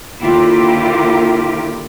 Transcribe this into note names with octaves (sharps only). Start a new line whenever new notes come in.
D#2 D3 E4 F4 G4 A#4